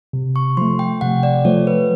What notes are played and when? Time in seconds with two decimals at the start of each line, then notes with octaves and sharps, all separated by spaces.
0.13 C3
0.36 C#6
0.57 F3 A3 C6
0.79 G5
1.01 C3 F#5
1.23 D5
1.45 F3 A3 C#5
1.67 B4